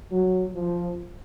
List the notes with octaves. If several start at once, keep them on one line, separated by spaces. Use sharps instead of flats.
F#3
F3